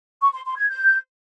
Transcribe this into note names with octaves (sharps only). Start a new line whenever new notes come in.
C#6
C6
C6
G#6
G6